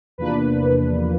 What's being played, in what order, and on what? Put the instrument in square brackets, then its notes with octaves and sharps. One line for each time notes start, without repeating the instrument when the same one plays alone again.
[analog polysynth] E2 C3 F3 A#3 D4 B4